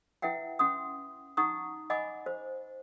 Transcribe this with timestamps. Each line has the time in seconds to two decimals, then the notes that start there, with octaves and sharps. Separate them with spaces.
0.22 E4 B4 E5 F#5 G5
0.59 C#4 F#5 C6 D#6
1.37 D#4 F#5 A#5 C#6 D#6
1.90 D#5 F#5 G#5 B5 D6
2.26 C5